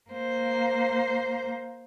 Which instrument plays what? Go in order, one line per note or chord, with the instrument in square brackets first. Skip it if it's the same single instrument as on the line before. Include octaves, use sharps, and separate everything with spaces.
[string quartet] A#3 C5